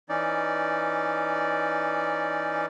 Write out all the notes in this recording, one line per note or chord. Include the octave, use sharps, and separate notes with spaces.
E3 C#4 D#4 D5